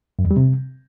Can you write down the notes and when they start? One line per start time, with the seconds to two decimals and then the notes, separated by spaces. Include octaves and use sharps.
0.19 F#2
0.25 E2
0.31 G3
0.37 C3